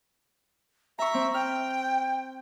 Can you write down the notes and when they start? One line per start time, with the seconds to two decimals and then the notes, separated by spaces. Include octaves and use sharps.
0.99 E5 A#5 C#6
1.14 C4
1.34 G5 F6